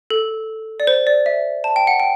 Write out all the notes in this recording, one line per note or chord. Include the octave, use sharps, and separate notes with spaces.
A4
D5
C5
D5
E5
A5
G5
F#5
G5